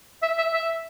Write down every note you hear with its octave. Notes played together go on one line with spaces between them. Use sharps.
E5
E5
E5